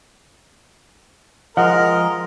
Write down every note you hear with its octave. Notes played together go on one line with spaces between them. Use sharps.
F3 G#3 A#4 D#5 F#5